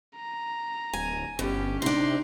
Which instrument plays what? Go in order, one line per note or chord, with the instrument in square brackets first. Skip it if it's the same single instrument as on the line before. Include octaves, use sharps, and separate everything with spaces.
[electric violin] A#5
[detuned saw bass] D1 [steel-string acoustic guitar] G#5
[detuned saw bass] G1 [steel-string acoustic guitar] B2 [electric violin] C#4 G4
[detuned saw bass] C3 [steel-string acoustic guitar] D4 D#4 [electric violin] C6